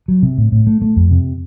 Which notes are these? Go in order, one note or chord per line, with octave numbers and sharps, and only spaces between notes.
F#3
C3
A2
A2
A3
A3
F2
C3